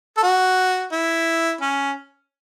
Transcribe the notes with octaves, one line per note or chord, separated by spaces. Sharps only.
A4
F#4
E4
C#4